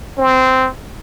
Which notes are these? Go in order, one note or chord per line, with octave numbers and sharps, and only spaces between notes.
C4